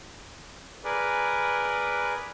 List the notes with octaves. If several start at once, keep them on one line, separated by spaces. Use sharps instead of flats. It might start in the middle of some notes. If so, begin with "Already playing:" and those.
G#4 A#4 B4 D5